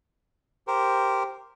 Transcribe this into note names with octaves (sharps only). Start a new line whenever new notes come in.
G4 A#4 C5